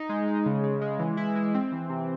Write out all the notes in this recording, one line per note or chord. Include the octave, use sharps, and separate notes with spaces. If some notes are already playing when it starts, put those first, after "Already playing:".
Already playing: D#4
G#3
G#3
C#3
C#3
G#3
E3
E4
G#3
C4
E3
C3